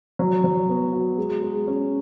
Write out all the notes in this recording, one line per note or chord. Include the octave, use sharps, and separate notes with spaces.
F#3
F#3
B3
F#4
G#3
G#3
C#4